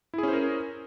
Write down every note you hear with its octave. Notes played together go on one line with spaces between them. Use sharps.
C#4 E4 G#4 A#4 C5